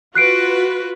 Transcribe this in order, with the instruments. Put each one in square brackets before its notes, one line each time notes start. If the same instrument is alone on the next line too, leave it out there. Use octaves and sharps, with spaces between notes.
[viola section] F4 F#4 B4 [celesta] F#6 C7 D7